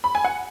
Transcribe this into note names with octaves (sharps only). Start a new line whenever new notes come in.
B5
G#5
F#5